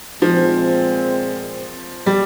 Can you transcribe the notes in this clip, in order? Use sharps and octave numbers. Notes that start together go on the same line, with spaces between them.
A#2 F3 G#3 C4
G3